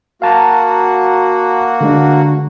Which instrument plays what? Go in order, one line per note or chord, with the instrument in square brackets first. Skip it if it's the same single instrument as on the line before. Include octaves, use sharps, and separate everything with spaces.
[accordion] A#3 F#4 [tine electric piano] F5 A5 A#5
[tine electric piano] D3 G#3 D4